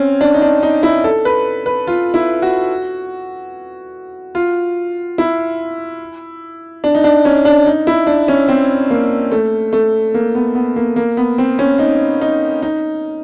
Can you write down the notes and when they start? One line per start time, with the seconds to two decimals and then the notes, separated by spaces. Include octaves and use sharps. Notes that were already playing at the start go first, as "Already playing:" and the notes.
Already playing: C4 C#4
0.21 D4
0.34 D#4
0.42 D4
0.63 D#4
0.83 E4
1.04 A4
1.25 B4
1.66 B4
1.87 F4
2.14 E4
2.42 F#4
4.35 F4
5.18 E4
6.84 D4
6.95 D#4
7.04 D4
7.25 C#4
7.45 D4
7.66 D#4
7.87 E4
8.07 D4
8.28 C#4
8.48 C4
8.90 A#3
9.32 A3
9.73 A3
10.14 A#3
10.35 B3
10.55 B3
10.76 A#3
10.96 A#3
11.17 B3
11.38 C4
11.59 C#4
11.79 D#4
12.21 D#4
12.62 D#4